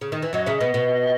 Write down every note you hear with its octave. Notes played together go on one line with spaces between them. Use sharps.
C#3
D#3
E3
F#2 F#3 D#5
C#3 C#4 E5
B2 B3 D#5
B2 B3